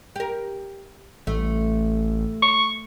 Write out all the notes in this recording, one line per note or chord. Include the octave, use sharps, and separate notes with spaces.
G4 A#4
A1 A3
C#6